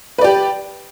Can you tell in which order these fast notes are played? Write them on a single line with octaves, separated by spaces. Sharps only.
B4 D5 G4